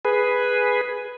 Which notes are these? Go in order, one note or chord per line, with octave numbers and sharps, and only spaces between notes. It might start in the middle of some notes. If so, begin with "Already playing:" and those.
G#4 B4